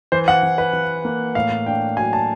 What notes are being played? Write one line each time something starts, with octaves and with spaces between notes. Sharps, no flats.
E3 C5
F#5
E3
B4
E3
A#3
A2 F5
D4 G5
F#3 G#5
A5